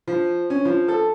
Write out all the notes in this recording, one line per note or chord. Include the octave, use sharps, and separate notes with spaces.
F3
C#4
F3
A4